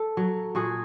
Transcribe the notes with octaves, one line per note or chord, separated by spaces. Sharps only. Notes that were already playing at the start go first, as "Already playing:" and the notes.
Already playing: A4
F#3
A#2 F#4 G#4